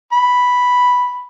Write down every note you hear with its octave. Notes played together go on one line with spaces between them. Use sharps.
B5